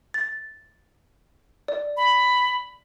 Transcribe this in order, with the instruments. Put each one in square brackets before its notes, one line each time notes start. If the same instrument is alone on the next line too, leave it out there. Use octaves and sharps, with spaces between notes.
[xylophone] A6
D5
[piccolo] B5